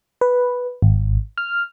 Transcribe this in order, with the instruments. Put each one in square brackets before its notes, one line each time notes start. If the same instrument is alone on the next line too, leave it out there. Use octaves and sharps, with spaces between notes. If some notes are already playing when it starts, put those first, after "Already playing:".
[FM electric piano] B4
G#1
F6